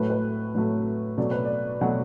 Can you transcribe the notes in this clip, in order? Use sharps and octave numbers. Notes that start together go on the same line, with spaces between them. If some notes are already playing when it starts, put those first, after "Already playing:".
Already playing: A2 F#3 A3 B4
B4
A2 F#3 A3
B2 F#3 A3 D5
B4
D5
B2 F#3 A3 F#5